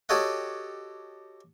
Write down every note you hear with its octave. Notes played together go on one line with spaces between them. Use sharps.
F#4 G4 A4 C#5 D#5 F#5